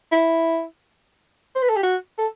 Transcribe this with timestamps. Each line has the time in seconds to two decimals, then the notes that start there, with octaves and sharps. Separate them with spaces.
0.12 E4
1.55 C5
1.62 B4
1.69 A4
1.76 G4
1.83 F#4
2.18 A4